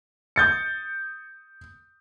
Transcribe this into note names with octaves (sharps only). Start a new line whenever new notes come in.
D#6 G6 A6 C#7